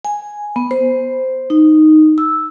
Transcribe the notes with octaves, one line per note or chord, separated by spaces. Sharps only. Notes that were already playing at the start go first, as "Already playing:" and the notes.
G#5
B3
C5
D#4
E6